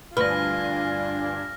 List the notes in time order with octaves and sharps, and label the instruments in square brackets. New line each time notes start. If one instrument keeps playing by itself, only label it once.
[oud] D2 B4 [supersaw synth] G2 D4 G#5 [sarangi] F4 [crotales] F6 A#6